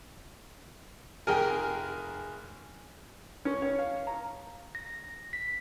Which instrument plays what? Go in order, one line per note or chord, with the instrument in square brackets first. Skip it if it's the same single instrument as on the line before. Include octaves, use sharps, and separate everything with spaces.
[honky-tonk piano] F1 G#4 G#5 [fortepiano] A#4 G5
[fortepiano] C#4
C#5
F5
A#5
[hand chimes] A#6
B6